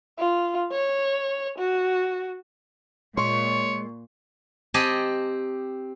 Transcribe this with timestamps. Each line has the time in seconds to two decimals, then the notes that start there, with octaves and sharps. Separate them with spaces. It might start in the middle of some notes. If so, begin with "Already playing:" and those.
0.19 F4
0.72 C#5
1.58 F#4
3.17 A#2 G#3 C#5 C6 C#6
4.74 C4 G4 D#5 G#5 A5